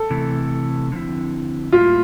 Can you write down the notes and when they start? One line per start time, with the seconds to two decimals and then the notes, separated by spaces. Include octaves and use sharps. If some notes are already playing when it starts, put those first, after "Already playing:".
Already playing: A4
0.10 C3 E3 A3
0.92 D3 F3 C4 E4
1.72 A2 G3 A#3 E4 F4